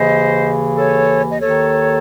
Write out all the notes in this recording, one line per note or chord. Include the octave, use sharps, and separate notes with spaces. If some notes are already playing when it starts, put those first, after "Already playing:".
Already playing: D#2 C#3 E3 C5 D#5
A4 C#5
D#5
D#2 D#3 A4 C#5